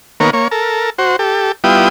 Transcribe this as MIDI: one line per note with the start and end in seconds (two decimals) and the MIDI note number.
0.20 0.30 51
0.20 0.30 58
0.20 0.30 59
0.20 0.30 70
0.20 0.30 73
0.33 0.48 58
0.33 0.48 73
0.51 0.90 69
0.51 0.90 70
0.98 1.16 66
0.98 1.16 72
1.19 1.52 67
1.19 1.52 69
1.64 1.89 55
1.64 1.89 59
1.64 1.89 64
1.64 1.89 65
1.64 1.89 79
1.64 1.89 87